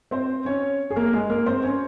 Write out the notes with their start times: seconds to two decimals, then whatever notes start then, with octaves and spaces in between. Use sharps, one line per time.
0.11 C4 C5
0.45 C#4 C#5
0.91 G#4
0.96 A#3 A#4
1.13 G#3 G#4
1.30 A#3 A#4
1.46 C4 C5
1.63 C#4 C#5